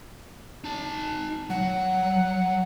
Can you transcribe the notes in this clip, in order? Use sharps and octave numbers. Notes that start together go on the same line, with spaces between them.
D#4 A5
F#3 F#5